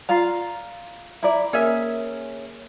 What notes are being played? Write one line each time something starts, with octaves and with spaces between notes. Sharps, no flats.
F4 D5 F5 A#5
E4 D5 E5 A#5
A#3 C#4 G#4 A#4 E5